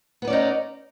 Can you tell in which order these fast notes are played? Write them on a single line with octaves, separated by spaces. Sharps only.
B3 B4 D5 C#4 D#4